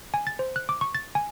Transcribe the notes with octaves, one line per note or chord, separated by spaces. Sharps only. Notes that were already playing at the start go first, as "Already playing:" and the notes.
G#5
A6
C5
F#6
D6
C#6
A6
G#5